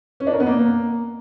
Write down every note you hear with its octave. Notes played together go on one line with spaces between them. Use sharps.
C#4
D4
A#4
B3
A#3